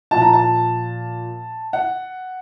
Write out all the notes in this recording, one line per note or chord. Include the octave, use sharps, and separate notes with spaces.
A#2 F3 A5
A#5
A5
F#5